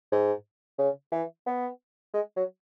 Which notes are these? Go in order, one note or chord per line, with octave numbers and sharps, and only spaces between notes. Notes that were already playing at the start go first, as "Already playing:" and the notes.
G#2
C#3
E3
B3
G#3
F#3